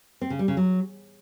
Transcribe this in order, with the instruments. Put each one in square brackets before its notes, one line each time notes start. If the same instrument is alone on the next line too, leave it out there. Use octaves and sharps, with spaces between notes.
[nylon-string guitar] C4
C#3
G3
C#3
F#3